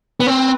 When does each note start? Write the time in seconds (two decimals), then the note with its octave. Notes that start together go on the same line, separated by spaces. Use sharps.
0.20 B3
0.27 C4 B4